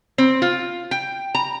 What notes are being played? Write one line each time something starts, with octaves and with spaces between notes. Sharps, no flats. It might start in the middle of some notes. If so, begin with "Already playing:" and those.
C4
F4
G5
A#5